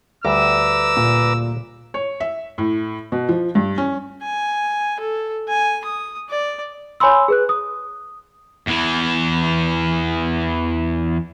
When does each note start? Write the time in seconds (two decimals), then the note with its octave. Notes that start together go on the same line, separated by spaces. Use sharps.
0.25 D2 G3 B4 G5 A#5 D6 E6
0.97 A#2
1.94 C#5
2.20 E5
2.58 A2
3.12 B2
3.29 F3
3.55 G2
3.78 C#4
4.22 G#5
5.00 A4
5.48 G#5
5.84 D#6
6.29 D5
7.00 C#5 G#5 B5 C6 E6
7.28 G#4 B4 F#6
7.49 D#6
8.68 E2 E3